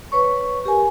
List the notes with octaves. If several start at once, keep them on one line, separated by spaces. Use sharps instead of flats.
B4 C#5 C#6
G4 A#4 G#5